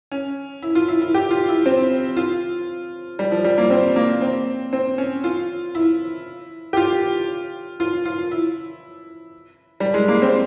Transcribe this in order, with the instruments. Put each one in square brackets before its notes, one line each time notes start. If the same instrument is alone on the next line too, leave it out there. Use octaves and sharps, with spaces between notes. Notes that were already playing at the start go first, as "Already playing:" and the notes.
[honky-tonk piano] C#4
E4
F4
E4
E4
G4
F4
E4
C4
F4
G3
F3
G3
A#3
C4
A#3
C4
C4
C#4
F4
E4
G4
F4
F4
F4
E4
G3
G#3
A#3
C4